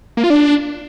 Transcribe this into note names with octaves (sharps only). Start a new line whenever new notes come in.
A#3
F4
D4